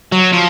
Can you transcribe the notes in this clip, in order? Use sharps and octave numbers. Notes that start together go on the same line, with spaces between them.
F#3
F3